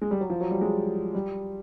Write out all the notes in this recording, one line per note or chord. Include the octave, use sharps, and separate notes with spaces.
G#3
G3
F#3
F3
F#3
G3
G#3
G3